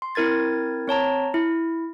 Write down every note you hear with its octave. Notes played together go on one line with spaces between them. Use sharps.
C6
C4 E4 A#4 G#6 A6
C4 C#5 A5 A#5
E4